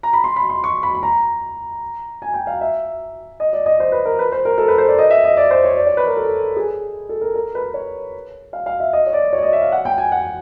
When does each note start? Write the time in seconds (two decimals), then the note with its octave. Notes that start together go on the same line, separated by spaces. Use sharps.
0.03 A#5
0.13 B5
0.24 C6
0.36 B5
0.49 C6
0.64 C#6
0.83 B5
0.95 B5
1.03 A#5
2.22 G#5
2.34 G5
2.47 F5
2.61 E5
3.40 D#5
3.53 D5
3.66 D#5
3.80 C5
3.92 B4
4.05 A#4
4.19 B4
4.32 C5
4.45 A#4
4.58 A4
4.68 B4
4.78 C5
4.88 D5
4.99 D#5
5.11 E5
5.24 D#5
5.37 D5
5.51 C5
5.64 C#5
5.77 D5
5.87 C#5
5.97 B4
6.06 A#4
6.17 A4
6.56 G#4
7.09 A4
7.21 A#4
7.35 A#4
7.55 B4
7.74 C#5
8.53 F5
8.66 F5
8.80 E5
8.93 D#5
9.07 C#5
9.13 D5
9.33 C#5
9.38 D5
9.43 D#5
9.53 E5
9.62 F5
9.72 F#5
9.85 G5
9.98 G#5
10.12 F#5